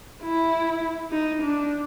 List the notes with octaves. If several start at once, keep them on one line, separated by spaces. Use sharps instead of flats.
E4
D#4
D4